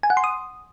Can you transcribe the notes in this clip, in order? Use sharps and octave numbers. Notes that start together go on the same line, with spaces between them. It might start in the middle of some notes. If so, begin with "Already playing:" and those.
G#5
F#5
C6
D#6